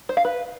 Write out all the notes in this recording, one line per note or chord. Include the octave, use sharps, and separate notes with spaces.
C5
F5
B4